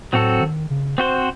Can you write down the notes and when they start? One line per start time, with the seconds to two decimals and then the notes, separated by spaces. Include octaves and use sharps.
0.13 A2 F#3 C4 F#4 A4
0.41 D#3
0.70 C#3
0.98 C4 F#4 C5